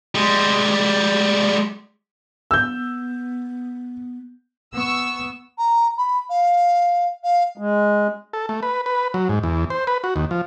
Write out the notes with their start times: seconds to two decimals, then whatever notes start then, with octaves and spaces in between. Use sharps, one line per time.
0.15 G3 G#3
2.51 B3 E6 G6
4.73 B3 C#6 E6
5.58 A#5
5.97 B5
6.29 F5
7.24 F5
7.58 G#3
8.33 A4
8.49 A3
8.63 B4
8.86 B4
9.14 F#3
9.29 G#2
9.43 E2
9.70 C5
9.87 B4
10.04 F#4
10.16 D#2
10.31 F3